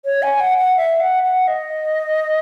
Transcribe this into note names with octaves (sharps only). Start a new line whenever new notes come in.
C#5
G#5
F#5
F#5
E5
F#5
F#5
D#5